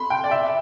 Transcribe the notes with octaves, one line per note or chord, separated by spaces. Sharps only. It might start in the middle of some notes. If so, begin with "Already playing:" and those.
Already playing: B5 C6
G5
D5
E5